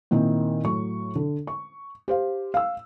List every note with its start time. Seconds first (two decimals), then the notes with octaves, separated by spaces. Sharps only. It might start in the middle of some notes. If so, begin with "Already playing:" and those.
0.11 A#2 D#3 C4 D#4 E4
0.64 A2 F#3 C#6
1.16 D3
1.47 C#6
2.08 G4 C5 F5
2.54 F5 E6